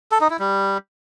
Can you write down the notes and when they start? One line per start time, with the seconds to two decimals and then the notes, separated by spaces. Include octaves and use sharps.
0.12 A4
0.21 D#4
0.30 E4
0.39 G3